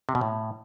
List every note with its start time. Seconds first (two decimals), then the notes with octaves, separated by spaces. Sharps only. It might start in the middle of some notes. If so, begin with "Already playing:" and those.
0.09 C3
0.15 B2
0.21 A2